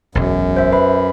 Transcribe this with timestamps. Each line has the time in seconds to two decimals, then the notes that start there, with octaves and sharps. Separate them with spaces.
0.15 E1 B1 F#2
0.57 C5 E5
0.72 B4 B5